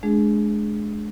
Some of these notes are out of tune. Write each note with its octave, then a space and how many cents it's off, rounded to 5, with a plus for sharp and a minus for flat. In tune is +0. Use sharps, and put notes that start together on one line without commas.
G#3 +35 D4 +0 G#4 +0